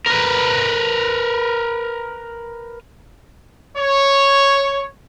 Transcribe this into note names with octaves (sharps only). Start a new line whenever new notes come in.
A#4 B4
C#5